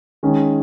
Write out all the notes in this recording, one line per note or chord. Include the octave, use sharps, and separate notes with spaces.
D#3 G#3 C#4